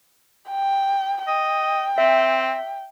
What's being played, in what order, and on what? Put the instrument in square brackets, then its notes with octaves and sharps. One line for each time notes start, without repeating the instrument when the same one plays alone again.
[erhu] G5
[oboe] D#5 [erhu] G5
[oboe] C4 [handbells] E5